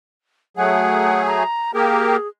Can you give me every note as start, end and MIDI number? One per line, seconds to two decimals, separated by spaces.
0.57 1.43 54
0.57 1.43 57
0.57 1.43 68
0.57 1.22 78
1.27 1.71 82
1.74 2.17 58
1.74 2.17 67
1.74 2.28 68
1.74 2.17 70